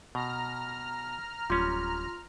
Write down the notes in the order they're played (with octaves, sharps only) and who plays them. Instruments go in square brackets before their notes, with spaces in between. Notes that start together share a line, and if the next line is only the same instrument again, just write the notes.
[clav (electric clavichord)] B2 [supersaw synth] A#5 F6
[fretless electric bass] D1 [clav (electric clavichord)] G3 C#4 [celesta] F4 C6